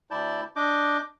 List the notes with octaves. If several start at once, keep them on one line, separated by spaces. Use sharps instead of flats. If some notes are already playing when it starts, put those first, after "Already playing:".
D2 E4 D5 A5 G6
D4 D#5 D6 G6